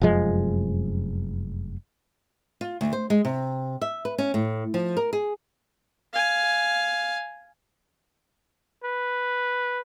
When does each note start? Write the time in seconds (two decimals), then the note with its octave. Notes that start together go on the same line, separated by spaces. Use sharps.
0.02 F1 F#2 F3 G#3
2.61 F4
2.81 D2
2.93 C5
3.10 G#3
3.25 C3
3.81 E5
4.05 B4
4.18 C#4
4.34 A2
4.74 F3
4.97 A#4
5.13 G#4
6.13 F5 G#5
8.84 B4